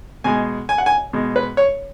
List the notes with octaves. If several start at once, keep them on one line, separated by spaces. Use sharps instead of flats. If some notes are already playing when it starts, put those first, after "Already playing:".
B2 G#3 G#5
G#5
F#5
G#5
B2 G#3
B4
C#5